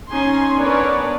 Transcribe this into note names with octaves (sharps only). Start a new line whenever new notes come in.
C#4 D#4 G#5 C6
B3 D4 A#4 B4 C#5 D5